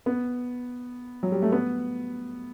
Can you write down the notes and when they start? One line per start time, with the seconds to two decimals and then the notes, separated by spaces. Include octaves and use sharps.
0.06 B3
1.23 F#3
1.32 G3
1.42 A3
1.52 B3